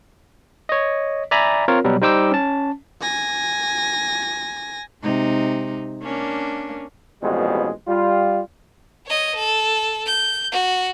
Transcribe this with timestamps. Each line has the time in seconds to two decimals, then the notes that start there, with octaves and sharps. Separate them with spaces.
0.69 C#5 D#5
1.31 D5 E5 G#5 A#5 B5
1.68 C4 F4 A#4 C#5
1.84 B2 F#3 G3
2.02 G3 D#4 C5 G5 D6 E6
2.31 C#4 A5
3.01 G#5 A#6
5.03 C3 G#3 D#4
6.02 A#3 C#4 D4
7.22 A1 F2 B2 G3 G#3
7.87 G3 F4
9.06 C#5 D#5
9.35 A4
10.06 G6
10.52 F#4